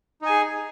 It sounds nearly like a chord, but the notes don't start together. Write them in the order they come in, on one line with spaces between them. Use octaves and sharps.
D#4 G#5 G#4